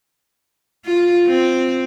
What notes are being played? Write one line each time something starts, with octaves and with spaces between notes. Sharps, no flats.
F4
C4